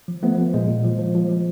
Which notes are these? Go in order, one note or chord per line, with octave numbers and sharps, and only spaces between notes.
F3
F3 A3 B3
F3
A#2 G#3 A#3
A#2
F3
F3
F3
F3